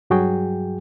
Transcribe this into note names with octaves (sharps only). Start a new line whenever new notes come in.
G2 F#3 F#4 G#4 G5